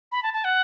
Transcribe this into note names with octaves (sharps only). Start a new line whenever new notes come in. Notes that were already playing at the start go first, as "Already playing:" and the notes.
B5
A5
A5
F#5